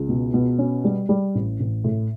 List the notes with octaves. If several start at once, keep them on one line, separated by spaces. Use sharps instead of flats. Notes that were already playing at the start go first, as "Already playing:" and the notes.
Already playing: C#2
B2
B2
C#4
G3
G3
A1
A1
A2